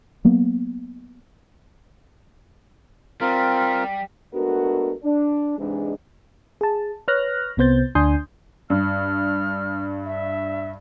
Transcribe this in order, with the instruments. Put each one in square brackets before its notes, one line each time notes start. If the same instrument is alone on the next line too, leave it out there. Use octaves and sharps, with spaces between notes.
[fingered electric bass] F#3 A#3 B3
[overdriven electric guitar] G3 [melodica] C4 F4 A#4
[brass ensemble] G#3 A3 B3 D4 F#4 A#4
D4
G#2 C3 E3 G#3 D4
[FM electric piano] G#4 A5
B4 C#5 F6 F#6 A#6
C2 C3 B3 C5 G6 A6
D2 D4 G#5 C6 D#6 G6
[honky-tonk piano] G2 [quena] F6
[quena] E5